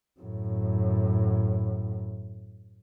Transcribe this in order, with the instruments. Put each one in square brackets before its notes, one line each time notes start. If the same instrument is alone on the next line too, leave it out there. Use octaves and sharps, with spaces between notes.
[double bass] F#2 A2